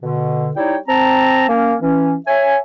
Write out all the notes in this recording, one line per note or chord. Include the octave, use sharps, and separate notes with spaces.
B2 D3
G3 D#4 E4 C#5 D5 G5
C4 A5 A#5
A#3 C#4
E3 C#4
C#5 E5 G#5